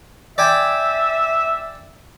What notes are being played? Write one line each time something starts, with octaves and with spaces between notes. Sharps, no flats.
D5 E5 G5 G#5